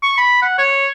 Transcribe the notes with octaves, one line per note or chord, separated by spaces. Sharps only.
C#6
B5
F#5
C#5